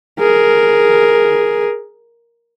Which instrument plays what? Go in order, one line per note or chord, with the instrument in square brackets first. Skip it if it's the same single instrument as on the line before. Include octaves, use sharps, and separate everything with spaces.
[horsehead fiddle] G#4 A#4